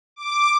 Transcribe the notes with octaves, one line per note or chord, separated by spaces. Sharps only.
D6